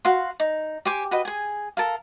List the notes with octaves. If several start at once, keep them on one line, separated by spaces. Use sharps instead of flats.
F#4 F5 C6
D#4
G4 C5 G#5 D6
F#4 B4 D#5
G#4 G#5
A4 A#4 F5